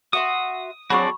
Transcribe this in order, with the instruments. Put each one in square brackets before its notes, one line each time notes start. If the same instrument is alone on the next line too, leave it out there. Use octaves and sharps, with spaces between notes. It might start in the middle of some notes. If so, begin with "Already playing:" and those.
[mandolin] F#4 E5 C6 [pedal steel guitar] D#6
[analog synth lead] F#3 [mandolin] C4 D4 G#4 [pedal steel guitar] F#4 D5 [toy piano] B5 C#6